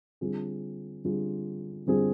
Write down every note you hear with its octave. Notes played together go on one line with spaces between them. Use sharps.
D3 G3 C4 F4 G#4
D3 G3 C4 F4 G#4
D3 G3 C4 F4 G#4